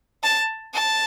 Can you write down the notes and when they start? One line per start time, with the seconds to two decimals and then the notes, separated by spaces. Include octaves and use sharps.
0.23 A5
0.74 A5